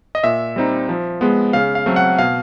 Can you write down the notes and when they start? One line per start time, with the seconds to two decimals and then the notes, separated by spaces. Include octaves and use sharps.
0.15 D#5
0.24 A#2 E5
0.56 G3 C4 D#4
0.89 F3
1.21 G#3 B3
1.53 C#3 F5
1.75 F5
1.86 F#3 A3 C4
1.96 F#5
2.19 B2 F5